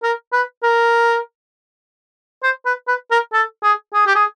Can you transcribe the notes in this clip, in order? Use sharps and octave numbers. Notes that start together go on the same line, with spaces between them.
A#4
B4
A#4
C5
B4
B4
A#4
A4
G#4
G#4
G4
G#4